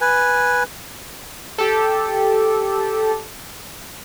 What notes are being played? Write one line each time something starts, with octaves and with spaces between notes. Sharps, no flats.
B4 G#5
G4 A4